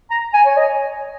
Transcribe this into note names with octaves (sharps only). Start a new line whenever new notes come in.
A#5
G#5
C#5
D#5